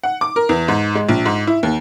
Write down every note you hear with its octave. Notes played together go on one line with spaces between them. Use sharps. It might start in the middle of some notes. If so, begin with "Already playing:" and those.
F#5
D6
A#4
E2
G#2
G#3
A#1
G#2
E4
D#2